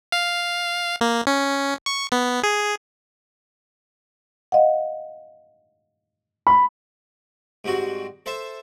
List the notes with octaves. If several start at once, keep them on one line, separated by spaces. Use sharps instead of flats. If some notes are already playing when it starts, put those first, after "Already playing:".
F5
A#3
C#4
C#6
B3
G#4
D#5 F5 F#5
B5
G#2 G3 C4 F#4
A4 C5 E5